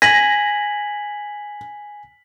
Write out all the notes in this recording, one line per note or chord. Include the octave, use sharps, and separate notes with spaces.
G#5 A#6 B6 F#7